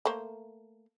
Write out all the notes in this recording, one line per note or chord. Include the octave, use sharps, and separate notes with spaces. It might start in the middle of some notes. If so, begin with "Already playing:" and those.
A3 A#3 C5